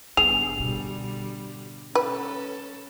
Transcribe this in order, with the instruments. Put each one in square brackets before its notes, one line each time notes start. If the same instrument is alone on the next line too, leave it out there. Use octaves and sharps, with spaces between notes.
[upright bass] G#1 C#3 [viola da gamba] G2 B3 [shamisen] G#4 [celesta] F7
[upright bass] G#2 B2 [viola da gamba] D3 G3
[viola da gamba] C#4 A4 [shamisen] B4